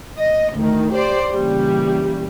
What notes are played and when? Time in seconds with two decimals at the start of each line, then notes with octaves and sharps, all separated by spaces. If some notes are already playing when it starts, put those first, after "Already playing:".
0.16 D#5
0.55 D2 D#3
0.93 G4 C5 D5
1.32 A#2 C#3 E3 G3